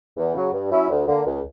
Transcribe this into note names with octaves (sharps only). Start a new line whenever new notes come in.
E2
C#3 F#3
G2
F#3 C#4 E4
D2
D3 A#3
C#2